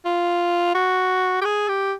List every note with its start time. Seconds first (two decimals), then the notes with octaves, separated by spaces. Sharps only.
0.05 F4
0.75 F#4
1.41 G4
1.45 G#4
1.69 G4